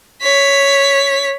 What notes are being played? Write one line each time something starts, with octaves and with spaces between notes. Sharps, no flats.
C#5 B6